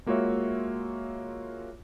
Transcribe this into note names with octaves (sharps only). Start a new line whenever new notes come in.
G#3 A#3 F4 F#4 C#5 E5